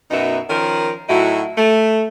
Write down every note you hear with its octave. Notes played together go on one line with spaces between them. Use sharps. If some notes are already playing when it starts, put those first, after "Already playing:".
F#2 B2 B3 D#4 F#4 E5
D#3 F3 C#4 A#4
A2 F#3 D#4 E4 F#4
A3